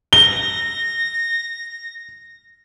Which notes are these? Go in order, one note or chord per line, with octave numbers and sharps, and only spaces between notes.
A#6 G7